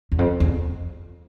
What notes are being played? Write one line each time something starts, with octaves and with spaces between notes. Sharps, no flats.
E2
F2
E2